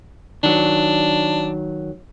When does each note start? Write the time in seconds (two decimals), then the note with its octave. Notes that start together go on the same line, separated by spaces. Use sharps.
0.43 D#3 F#3 D4